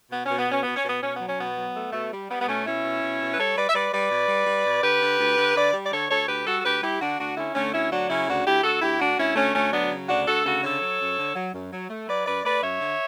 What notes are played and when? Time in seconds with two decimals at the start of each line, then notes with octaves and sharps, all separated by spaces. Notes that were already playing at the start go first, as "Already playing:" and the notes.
0.12 B2 B3
0.25 B2 C#4
0.38 B3
0.49 B2 C#4
0.63 B2 B3
0.76 C#4
0.84 B2 B3
1.01 B2 C#4
1.14 B3
1.21 F#3
1.27 C#4
1.39 B2 B3
1.57 F#3
1.76 A3
1.93 B2 A3
2.12 G3
2.30 G3 B3
2.41 B3
2.47 B2 A3 C#4
2.65 B2 C#4 E4
2.84 B2
3.03 B2
3.20 B2
3.32 B4
3.38 G3 A4 C#5
3.57 G3 B4 D5
3.69 E5
3.75 G3 B4 D5
3.92 G3 B4 D5
4.11 B2
4.29 G3
4.47 G3
4.66 B2
4.83 D3 G4 B4
5.02 D3
5.20 D2
5.38 D3
5.55 D3 B4 D5
5.74 G3
5.84 D5
5.92 D3 A4 C#5
6.10 D2 A4 C#5
6.28 D2 G4 B4
6.46 G3 F#4 A4
6.60 A4
6.64 D2 G4 B4
6.82 G3 E4 G4
7.00 D3 D4 F#4
7.19 D2 D4 F#4
7.37 D3 C#4 E4
7.55 D3 A3 C#4
7.73 D2 C#4 E4
7.91 F#3 D4 F#4
8.09 C#3 C#4 E4
8.28 D2 D4 F#4
8.46 D2 E4 G4
8.64 D2 F#4 A4
8.82 D2 E4 G4
9.00 D2 D4 F#4
9.18 D2 C#4 E4
9.36 D2 A3 C#4
9.54 D2 A3 C#4
9.72 F#3 B3 D4
9.91 C#3
10.08 D2 D4 F#4
10.27 D2 F#4 A4
10.45 C#3 F#4 A4
10.63 D3 A4 C#5
10.82 F#3
11.00 F#2
11.17 D3
11.35 F#3
11.54 F#2
11.72 F#3
11.90 A3
12.08 F#3 B4 D5
12.26 F#2 B4 D5
12.45 A3 B4 D5
12.63 F#2 C#5 E5
12.81 D3